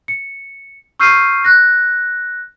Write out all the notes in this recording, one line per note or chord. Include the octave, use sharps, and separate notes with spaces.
C#7
C#6 E6 F6 G6 C7 D#7
F#6 A#6